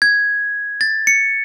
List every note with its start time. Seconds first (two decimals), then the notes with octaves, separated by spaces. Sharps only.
0.02 G#6
0.81 A6
1.07 C#7